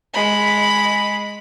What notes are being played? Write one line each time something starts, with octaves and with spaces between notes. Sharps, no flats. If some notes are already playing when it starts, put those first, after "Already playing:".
G#3 B5